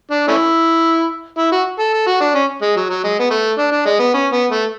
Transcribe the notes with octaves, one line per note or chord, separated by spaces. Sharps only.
D4
A3 C#4 E4
E4
F#4
A4
A4
F#4
D4
C#4
G#3
F#3
F#3
G#3
B3
A3
D4
D4
G#3
B3
C#4
B3
A3